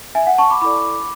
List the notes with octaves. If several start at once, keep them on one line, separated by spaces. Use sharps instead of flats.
E5 G#5
F#5
A5 C#6
B5 D6
E4 A4 D5 B5 D6